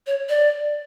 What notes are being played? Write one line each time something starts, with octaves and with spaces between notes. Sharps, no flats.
C#5
D5